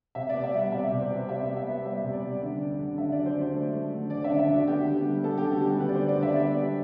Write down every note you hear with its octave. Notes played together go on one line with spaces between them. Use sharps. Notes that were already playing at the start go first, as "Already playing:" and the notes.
C3 E5
B3 D5
E5
G3 F#5
C3 E5
C3 D5
C5
C3 B4
C3 E5
B3
E5
B3
G3 E5
C3
D5
G3
D3
D3
D3
D3 E5
D5
F#3
C5
D3
C5
A3
A3
D3
D3 D5
E5
D3
E5
D3 F#4
B3 G4
D3
G3
B3 A4
D3 G4
F#4
G3
G4
D3 B4
D5
B3 C5
D5
D3 E5
G3 D5
B3